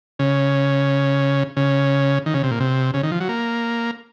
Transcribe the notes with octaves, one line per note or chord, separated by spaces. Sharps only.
C#3
C#3
D#3
C#3
C3
A#2
C3
C#3
D#3
F3
F#3
A#3